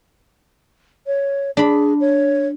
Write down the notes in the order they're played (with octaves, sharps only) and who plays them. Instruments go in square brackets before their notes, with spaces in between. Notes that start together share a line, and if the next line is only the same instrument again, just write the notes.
[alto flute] C#5
[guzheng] D4 B5 [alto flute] G#4
[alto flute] C#5